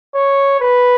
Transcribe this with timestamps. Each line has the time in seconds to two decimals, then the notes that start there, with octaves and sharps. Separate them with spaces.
0.15 C#5
0.60 B4